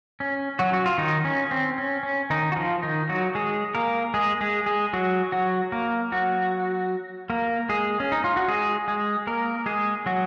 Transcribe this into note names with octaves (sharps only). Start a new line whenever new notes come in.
C#4
F#3 F#4
F#4
F4
D#3 D#4
C#4
C4
C#4
C#4
D#3 D#4
F#4
F3 F4
D#3 D#4
F#3 F#4
G#3 G#4
A#3 A#4
G#3 G#4
G#3 G#4
G#3 G#4
F#3 F#4
F#3 F#4
A#3 A#4
F#3 F#4
A#3 A#4
G#3 G#4
C#4
D#4
F4
F#4
G#3 G#4
G#3 G#4
A#3 A#4
G#3 G#4
F#3 F#4